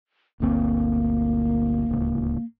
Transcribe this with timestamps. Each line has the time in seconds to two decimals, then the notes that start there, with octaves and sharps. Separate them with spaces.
0.40 G1 D2 A#3 C4
1.89 D1 C#2